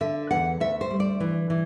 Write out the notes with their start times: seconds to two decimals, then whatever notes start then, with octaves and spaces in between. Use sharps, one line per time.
0.01 D3 E5
0.31 E2 F#5
0.60 D2 E5
0.81 C5
0.91 G3
1.00 D5
1.20 E3
1.50 E3